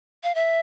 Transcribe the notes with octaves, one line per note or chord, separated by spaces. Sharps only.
F5
E5